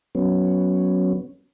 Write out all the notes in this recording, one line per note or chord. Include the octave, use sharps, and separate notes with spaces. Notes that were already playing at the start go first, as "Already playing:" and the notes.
F#3 B3 C#4